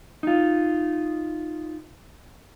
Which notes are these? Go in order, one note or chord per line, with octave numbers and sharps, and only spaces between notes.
D#4 F4